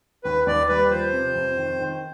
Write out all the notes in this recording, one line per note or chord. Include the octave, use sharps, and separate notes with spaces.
D#2 B4
D#2 D5
G3 B4
F3 C5
C3
F2
D#3
D#3